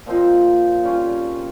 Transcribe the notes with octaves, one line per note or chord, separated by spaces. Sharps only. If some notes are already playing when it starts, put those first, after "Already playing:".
A#2 F3 C4 D#4
C#3 G3 C#4 F4